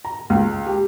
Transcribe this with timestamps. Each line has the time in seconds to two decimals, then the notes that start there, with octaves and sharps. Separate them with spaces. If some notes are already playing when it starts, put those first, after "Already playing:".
0.05 A#5
0.30 C#2
0.66 G4